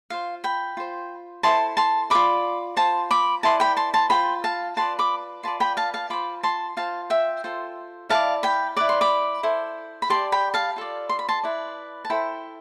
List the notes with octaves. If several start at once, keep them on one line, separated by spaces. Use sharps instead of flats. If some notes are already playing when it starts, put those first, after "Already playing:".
F4 C5 F5
G5 B5
F4 C5
E4 A4 C5 A5 C6
A5 C6
F4 B4 D5 B5 D6
F4 C5 A5 C6
B5 D6
E4 B4 D5 A5 C6
G5 B5
A5 C6
A5 C6
F4 C5 G5 B5
F5 A5
F4 B4 D5 A5 C6
B5 D6
F4 B4 D5 A5 C6
G5 B5
F5 A5
F5 A5
F4 C5 B5 D6
A5 C6
F4 C5 F5 A5
E5 G5
F4 A4 C5
E4 B4 F5 A5
D5
G5 B5
E4 B4 D5 D6
C6
B5 D6
E4 A4 C5
B5
G4 D5 A5 C6
G5 B5
F5 A5
F4 A4 D5
C6
B5
A5 C6
E4 B4 D5
A5
E4 A4 C5 G5 B5